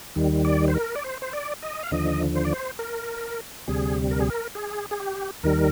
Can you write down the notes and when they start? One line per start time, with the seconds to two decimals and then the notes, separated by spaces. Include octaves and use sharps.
0.16 D#2 D#3 G3
0.45 D5
0.68 C5
0.74 A#4
0.96 D5
1.04 C5
1.22 C5
1.33 D5
1.62 D#5
1.83 F5
1.91 D#2 D3 F3 D#5
2.35 C5
2.45 D5
2.53 C5
2.79 A#4
3.68 D2 C3 G3 G#4
4.11 A#4
4.20 G#4
4.30 A#4
4.55 G#4
4.91 G#4
5.00 G4
5.43 D#2 D#3 G3 A#4